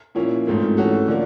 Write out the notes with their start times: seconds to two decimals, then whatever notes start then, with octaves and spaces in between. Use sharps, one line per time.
0.15 A#2 F3 A#3 C#4 E4
0.47 G#2 F3 A3 C4
0.77 E3 A3 C#4 F#4 A4
1.08 D3 F3 A#3